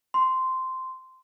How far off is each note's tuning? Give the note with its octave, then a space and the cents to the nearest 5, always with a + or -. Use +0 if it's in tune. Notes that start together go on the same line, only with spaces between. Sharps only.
C6 -10